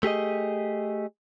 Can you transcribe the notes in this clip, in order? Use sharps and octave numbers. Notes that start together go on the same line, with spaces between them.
A3 G4 G#4 D#5